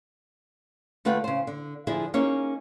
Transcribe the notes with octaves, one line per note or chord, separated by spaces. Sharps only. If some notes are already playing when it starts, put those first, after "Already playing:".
D2 A3 F4 B4 F#5 G5
C#3 C5
D3
D3 F3 E4 G#4 G#5
A#3 C#4 D#4 G#4 C#5